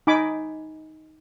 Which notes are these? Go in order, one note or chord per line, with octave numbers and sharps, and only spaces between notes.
D#4 G#5 B5 D6